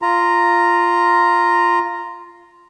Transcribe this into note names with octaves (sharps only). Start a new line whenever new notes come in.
F4 A#5